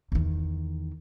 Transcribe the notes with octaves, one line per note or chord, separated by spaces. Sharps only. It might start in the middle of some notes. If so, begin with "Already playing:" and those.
E2 D#3